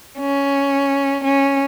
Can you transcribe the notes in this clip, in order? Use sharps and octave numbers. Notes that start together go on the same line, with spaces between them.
C#4
C#4